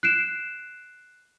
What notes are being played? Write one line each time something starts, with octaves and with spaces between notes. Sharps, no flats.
F#6 C7 D7 E7